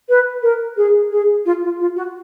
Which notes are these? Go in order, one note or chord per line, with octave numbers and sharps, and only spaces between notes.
B4
A#4
G#4
G#4
F4
F4
F4
F#4